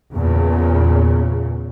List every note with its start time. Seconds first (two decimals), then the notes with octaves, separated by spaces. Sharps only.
0.12 E2 A#2 C#3